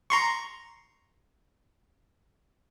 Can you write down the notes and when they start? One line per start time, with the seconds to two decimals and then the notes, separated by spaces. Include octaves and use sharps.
0.10 A#5 C6 C#6